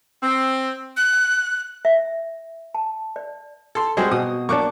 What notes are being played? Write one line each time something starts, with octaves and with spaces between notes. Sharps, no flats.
C4
F#6
E5
A5
D5
A4 C6
G3 G#3 C4 F#4 G#4 C5
B2 D#6
A#3 D4 C#6 D6 F#6